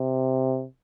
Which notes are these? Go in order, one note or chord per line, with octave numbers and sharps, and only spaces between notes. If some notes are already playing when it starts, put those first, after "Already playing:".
Already playing: C3